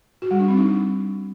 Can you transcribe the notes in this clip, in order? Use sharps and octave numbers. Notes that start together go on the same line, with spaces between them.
F#4
G3
D4
C4
D#4